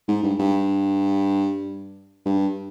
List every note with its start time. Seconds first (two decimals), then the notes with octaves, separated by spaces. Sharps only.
0.08 G#2
0.23 G2
0.39 G2
2.25 G2